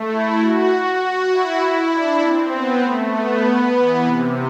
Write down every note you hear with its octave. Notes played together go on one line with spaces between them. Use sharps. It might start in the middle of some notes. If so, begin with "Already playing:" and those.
Already playing: A3
E4
F#4
F#4
E4
D4
C4
B3
A3
B3
E3
C3